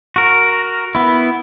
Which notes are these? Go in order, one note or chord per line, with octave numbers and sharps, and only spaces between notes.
F#4 A#4
B3 E4